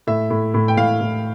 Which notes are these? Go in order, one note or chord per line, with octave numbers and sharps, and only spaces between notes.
A2 E5
A2
A2
G5
A2 F5
A2